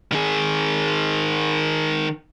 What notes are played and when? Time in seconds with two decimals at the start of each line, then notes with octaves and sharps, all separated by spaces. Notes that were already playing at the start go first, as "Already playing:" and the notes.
0.12 D#3 G#4